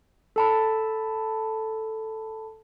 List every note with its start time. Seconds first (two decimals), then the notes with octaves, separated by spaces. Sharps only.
0.36 A4 A5 B5